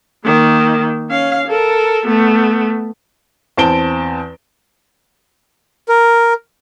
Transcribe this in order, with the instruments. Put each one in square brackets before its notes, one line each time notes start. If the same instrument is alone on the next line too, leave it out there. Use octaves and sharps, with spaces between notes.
[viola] D#3 A#3
C#4 F5
A4 A#4
A3 B3
[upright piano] E2 C4 A5 D7 G7
[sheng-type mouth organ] A#4